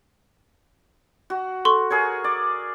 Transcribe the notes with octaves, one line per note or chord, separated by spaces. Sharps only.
F#4
A4 C6 C#6
G#4 A#4 C#5
D5